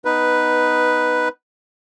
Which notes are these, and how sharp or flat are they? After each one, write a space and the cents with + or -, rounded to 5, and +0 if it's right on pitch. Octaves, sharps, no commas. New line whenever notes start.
B3 +10 D#4 +0 B4 +0